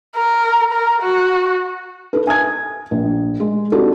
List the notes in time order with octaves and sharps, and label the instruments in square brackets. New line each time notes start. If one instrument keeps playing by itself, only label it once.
[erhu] A#4
A#4
F#4
[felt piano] D#4 A4 B4
G#5 D#6 G#6
A#1
G#3
C4 D4 D#4 F#4 G4 A4